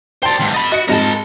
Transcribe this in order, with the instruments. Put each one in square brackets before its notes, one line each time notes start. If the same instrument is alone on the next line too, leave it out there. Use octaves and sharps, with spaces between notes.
[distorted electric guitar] C5 D5 [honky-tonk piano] G5 A5 C6
[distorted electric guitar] E2 G#2
[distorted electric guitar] D#5 B5 [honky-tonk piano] A6
[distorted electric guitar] F#4 [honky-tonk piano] D#5 C#7
[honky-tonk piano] F2 G#2 G#3 [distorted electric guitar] A#4 A5